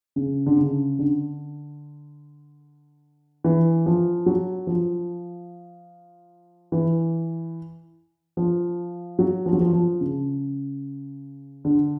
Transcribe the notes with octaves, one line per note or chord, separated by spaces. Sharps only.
C#3
D3
C#3
D3
E3
F3
F#3
F3
E3
F3
F#3
F3
F#3
F3
F3
C#3
D3